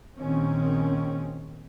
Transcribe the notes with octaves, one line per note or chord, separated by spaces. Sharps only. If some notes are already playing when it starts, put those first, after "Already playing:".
A#1 D#3 C4 C#4